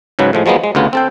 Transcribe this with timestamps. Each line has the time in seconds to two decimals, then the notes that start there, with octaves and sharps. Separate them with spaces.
0.19 G#2 C#3 F#3 B4
0.33 A2 F3 G#3
0.46 F3 F#3 G#3 A#3 B3
0.64 G#3
0.75 D2 C#3 B3 F4
0.93 C4 A4 G5